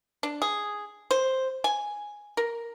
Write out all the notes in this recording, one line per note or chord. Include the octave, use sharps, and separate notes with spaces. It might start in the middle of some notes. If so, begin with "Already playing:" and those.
D4
G#4
C5
G#5
A#4